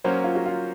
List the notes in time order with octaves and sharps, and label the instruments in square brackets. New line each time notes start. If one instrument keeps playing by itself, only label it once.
[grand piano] F#3 A#3 C#4 [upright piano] C5
[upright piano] F4
F#4
F4